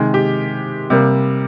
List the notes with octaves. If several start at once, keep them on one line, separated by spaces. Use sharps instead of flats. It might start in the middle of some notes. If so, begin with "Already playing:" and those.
Already playing: C3 D#3 G#3
G4
C3 G3 A#3